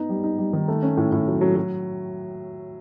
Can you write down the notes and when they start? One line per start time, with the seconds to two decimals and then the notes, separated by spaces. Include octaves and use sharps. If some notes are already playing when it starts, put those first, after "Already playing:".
Already playing: B3 D#4
0.09 G3
0.24 D#4
0.38 G3
0.53 D#3
0.68 A3
0.83 C#4
0.97 A2
1.12 A2
1.28 F#3
1.41 F#3
1.56 F#3